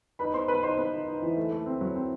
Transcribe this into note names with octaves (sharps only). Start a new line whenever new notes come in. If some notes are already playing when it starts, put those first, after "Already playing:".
D#4 B4 B5
B3 C5 C6
B3 B4 B5
D#4 C5 C6
B3 B4 B5
D#4
D#4
E3
A3
A3
C4
F#3
C4